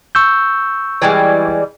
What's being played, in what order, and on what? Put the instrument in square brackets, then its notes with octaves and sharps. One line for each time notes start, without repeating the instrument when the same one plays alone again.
[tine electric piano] C#6 E6 G6
[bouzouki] E3 G3 G#3